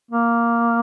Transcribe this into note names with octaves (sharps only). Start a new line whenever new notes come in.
A#3